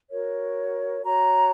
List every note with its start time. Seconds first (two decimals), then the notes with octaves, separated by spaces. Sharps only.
0.10 F#4 A#4 C#5
1.01 F#4 C#5 A#5